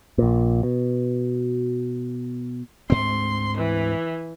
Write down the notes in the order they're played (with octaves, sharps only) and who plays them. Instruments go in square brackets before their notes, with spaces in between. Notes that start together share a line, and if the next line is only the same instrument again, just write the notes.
[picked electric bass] A#1 A#2
B2
[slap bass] D2 G#2 C4 [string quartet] C6
[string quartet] E3